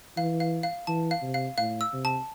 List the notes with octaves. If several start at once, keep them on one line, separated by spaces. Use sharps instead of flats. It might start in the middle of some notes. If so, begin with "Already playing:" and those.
E3 F5
F5
F5
E3 A5
F5
C3
F5
A2 F5
E6
C3
A5